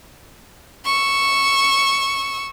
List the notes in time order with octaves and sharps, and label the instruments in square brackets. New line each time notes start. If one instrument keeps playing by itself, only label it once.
[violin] C#6 E6